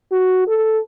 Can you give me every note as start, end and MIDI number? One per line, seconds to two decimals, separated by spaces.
0.12 0.46 66
0.48 0.80 69